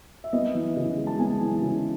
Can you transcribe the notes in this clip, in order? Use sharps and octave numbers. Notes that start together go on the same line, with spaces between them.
E5
B3 D#5
E3
C#3
G#3
A5
B3 G#5
E3
C#3